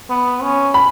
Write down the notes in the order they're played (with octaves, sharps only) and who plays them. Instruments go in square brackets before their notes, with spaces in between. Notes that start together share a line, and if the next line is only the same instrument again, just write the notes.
[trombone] B3
C#4
[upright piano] B5